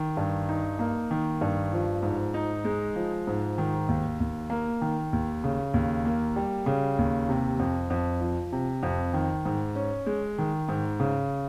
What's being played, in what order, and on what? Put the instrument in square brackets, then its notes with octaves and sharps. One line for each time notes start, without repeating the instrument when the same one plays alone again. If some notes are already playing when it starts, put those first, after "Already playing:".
Already playing: [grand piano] D#3
G2
D#4
A#3
D#3
G2
F3
G#2
D#4
G#3
F3
G#2
D#3
D#2
D#2
A#3
D#3
D#2
C#3
D#2
A#3
G3
C#3
D#2
C3
F2
F2
F3
C3
F2
D#3
G#2
C#4
G#3
D#3
G#2
C#3